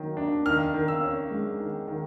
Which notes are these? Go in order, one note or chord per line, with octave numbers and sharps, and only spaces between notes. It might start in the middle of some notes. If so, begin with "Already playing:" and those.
Already playing: D#3 F#3 A#3
D4
D#3 F6
D#3
E6
C#4
G#3
D#3
D#3